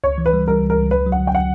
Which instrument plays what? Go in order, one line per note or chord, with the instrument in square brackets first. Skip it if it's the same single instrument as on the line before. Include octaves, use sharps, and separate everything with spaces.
[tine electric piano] C#2 [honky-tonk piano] C#5
[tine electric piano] E3
[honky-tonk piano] B4
[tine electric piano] G3
[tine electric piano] G3 [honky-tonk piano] A#4
[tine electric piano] C#2
[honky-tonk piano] A#4
[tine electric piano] C#2
[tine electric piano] F#3 [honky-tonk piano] B4
[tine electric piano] F#3
[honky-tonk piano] F#5
[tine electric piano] D3
[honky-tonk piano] G5
F#5